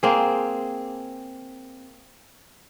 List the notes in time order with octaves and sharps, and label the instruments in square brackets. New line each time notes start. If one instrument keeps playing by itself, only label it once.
[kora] A#3 C4 G#4